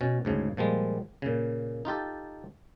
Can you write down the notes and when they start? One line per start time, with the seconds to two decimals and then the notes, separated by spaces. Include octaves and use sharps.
0.01 B2 C#4
0.25 D2 G#2 C#3
0.57 A#2 F3 G3 G#3
1.22 A#2 C#3
1.85 D#4 F4 G4 A4